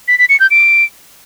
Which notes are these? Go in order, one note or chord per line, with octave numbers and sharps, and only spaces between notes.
B6
B6
C#7
G6
D7